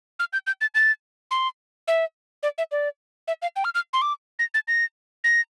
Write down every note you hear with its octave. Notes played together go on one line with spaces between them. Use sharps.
F6
G6
G6
A6
A6
C6
E5
D5
E5
D5
E5
F5
G5
F6
F6
C6
D6
A#6
A6
A#6
A#6